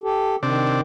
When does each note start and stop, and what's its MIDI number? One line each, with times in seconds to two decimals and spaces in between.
0.04 0.36 67
0.04 0.36 69
0.43 0.81 48
0.43 0.81 51
0.43 0.81 62